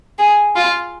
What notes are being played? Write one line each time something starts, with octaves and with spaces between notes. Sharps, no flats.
G#4
F4